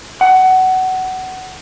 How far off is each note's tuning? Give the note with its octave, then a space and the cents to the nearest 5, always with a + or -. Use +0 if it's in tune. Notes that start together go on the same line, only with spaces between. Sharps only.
F#5 +20